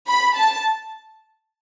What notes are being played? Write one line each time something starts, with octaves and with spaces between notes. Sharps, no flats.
B5
A5